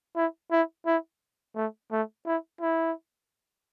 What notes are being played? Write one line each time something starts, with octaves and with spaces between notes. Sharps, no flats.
E4
E4
E4
A3
A3
E4
E4